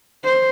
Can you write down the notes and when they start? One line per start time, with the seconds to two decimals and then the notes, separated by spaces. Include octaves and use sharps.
0.24 C5